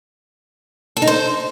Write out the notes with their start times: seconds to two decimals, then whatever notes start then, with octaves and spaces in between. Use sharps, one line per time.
0.97 A4
1.02 D#4
1.07 C5